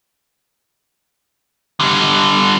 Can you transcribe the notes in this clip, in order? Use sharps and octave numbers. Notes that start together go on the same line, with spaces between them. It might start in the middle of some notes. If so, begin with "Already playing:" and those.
D3 G3